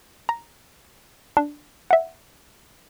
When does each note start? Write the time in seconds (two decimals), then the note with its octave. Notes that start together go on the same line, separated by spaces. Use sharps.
0.29 A#5
1.37 D4
1.91 E5 F#5